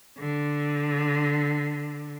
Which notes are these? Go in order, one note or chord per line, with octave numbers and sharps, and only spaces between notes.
D3